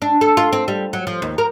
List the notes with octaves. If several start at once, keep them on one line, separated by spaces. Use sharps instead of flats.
D4
A4
F4
C4
G3
F#3
F3
D#2
A#4